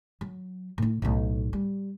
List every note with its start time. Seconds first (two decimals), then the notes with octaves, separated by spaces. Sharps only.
0.21 F#3
0.78 A2 E4
1.02 B1 A2
1.53 G3